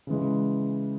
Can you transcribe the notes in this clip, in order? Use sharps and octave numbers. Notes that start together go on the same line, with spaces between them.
C#3 E3 G#3